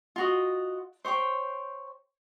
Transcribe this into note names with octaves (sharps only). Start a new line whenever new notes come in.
F4 F#4 D#5
C5 C#5 G5 C6